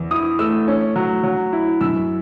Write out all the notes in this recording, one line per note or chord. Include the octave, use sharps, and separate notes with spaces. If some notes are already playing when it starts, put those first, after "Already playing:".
Already playing: E2
E4 D#6
A3 E6
C#4
F#3
F#3
E4
F#2 E6